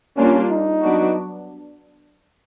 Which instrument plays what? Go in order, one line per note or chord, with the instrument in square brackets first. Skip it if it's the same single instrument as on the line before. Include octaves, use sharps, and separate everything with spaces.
[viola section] G3 A#3 D4 F4 [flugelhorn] C#4
[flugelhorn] D#4
[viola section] F#3 B3 D4 F#4